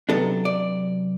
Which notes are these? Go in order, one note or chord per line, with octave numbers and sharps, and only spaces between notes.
C3 F#3 B3 D4 A4
D5